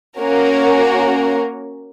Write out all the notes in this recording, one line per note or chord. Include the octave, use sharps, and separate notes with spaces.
A#3 C#4 F#4 A#4